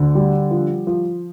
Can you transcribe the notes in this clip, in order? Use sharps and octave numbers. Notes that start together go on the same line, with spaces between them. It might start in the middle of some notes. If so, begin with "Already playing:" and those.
Already playing: D2 D3
G3
F3
F3